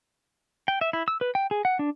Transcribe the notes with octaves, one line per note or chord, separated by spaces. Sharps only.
G5
E5
E4
E6
B4
G5
G#4
F#5
D4